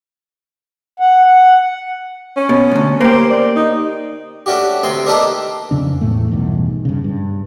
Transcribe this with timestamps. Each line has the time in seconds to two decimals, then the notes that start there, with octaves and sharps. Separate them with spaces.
1.00 F#5
1.26 F#5
2.37 C#4
2.49 B2
2.71 D2 G#2
3.01 A#3 G4 C5
3.30 D5
3.56 D#4
4.46 A3 C#4 D4 F#4 G4
4.83 D2 C3 C4 C6
5.06 A#3 D4 D#4 G4 A4 B4
5.71 F2 C#3 D4
6.01 E2 A2 A3
6.31 B1 E2 G2 D#3
6.85 G2 C#3
7.04 G2